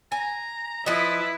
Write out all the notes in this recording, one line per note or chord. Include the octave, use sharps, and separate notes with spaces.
G#5 A#5
F3 E4 B4 D#5